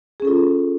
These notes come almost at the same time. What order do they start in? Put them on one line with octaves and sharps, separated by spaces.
G#4 C#4 A4 F4